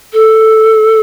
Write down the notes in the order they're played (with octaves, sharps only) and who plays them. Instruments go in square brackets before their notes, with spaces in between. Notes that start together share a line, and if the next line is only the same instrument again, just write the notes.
[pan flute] A4